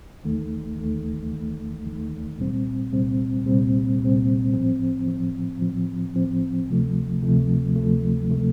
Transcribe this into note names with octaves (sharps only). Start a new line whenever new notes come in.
D#2 D#3 A3
D#2 D#3 A3
D#2 D#3 A3
D#2 D#3 A3
C2 A#2 G3 C4
C2 A#2 G3 C4
C2 A#2 G3 C4
C2 A#2 G3 C4
A2 F3 C4
A2 F3 C4
A2 F3 C4
A2 F3 C4
D2 C3 F3 A3
D2 C3 F3 A3
D2 C3 F3 A3
C3 F3 A3